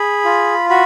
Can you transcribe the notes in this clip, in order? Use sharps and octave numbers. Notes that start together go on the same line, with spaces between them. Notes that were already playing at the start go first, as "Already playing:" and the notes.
Already playing: G#4 B5
F4
F#4 B5